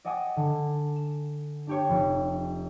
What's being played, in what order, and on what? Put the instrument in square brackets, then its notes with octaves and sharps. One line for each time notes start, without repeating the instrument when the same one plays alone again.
[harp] D5 D#5 F#5 G#5 D6 D#6
D3
E7
D4 G4 C#5
F1